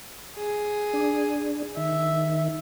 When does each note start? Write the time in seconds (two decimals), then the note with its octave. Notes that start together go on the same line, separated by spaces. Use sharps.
0.37 G#4
0.94 D4
1.77 D#3 E5